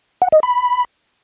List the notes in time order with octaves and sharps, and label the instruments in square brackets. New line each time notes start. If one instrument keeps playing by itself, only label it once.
[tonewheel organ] F#5
D#5
B5